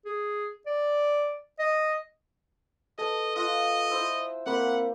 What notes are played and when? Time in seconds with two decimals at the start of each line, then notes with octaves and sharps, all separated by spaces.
0.05 G#4
0.66 D5
1.59 D#5
2.98 A4 B4 D#5 A5
3.36 F4 D#5 F#5
3.90 E4 C5 E6
4.46 A#3 C4 A#4 C5 F#5 B5